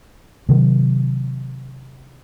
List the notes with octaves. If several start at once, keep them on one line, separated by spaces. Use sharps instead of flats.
C3 D#3 F#3